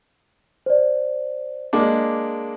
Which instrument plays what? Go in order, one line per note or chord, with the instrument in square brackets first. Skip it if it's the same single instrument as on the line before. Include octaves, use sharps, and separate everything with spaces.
[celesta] C5 D5
[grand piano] G#3 A#3 D4 [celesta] D6